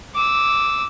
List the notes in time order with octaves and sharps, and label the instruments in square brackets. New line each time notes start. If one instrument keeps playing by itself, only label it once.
[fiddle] D6 E6